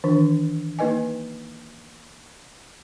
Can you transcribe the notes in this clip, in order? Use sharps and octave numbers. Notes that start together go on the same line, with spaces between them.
D#3 E3 D4
A#3 D#4 B4 D#5 G#5